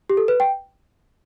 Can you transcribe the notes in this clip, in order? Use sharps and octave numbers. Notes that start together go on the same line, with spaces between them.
G4
A4
B4
G5